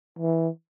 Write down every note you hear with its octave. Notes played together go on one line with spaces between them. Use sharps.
E3